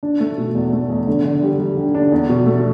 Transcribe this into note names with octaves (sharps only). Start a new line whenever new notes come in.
D4
A3
B2
E2
A3
E2
D3
D3
G3
G3
D3
D4
E2
B2
A3